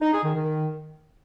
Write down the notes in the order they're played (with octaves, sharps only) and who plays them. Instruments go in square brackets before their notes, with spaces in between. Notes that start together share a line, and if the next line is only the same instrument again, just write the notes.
[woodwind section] D#4
G#4
D#3
D#3